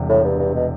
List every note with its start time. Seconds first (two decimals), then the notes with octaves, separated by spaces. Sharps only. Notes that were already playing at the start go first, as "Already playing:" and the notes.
Already playing: E1 E2 C3 G3
0.09 A2
0.24 G2
0.39 G2
0.55 B2